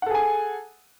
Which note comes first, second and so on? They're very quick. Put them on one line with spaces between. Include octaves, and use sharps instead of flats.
F#5 A4 G#4 G#5